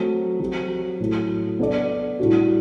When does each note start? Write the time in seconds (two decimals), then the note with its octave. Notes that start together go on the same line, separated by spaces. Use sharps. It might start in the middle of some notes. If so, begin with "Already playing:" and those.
Already playing: F#3 A3 C4
0.40 F#3 C4 G4
1.00 A2 F#3 A3
1.59 B3 D4 A4 D5
2.19 A2 G3 D4 F#4